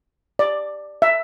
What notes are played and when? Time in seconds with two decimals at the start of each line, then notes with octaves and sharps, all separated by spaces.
0.39 D5
1.02 E5